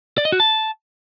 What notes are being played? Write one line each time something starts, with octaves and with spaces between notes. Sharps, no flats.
D5
D#5
F#4
A5